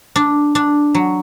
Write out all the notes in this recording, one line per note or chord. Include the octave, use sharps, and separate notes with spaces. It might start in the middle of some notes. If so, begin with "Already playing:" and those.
D4
D4
F#3